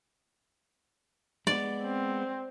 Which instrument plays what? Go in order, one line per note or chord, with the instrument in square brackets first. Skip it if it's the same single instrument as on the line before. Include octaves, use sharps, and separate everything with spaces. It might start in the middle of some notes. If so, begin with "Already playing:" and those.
[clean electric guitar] G#3 B3 [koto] D5
[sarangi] C4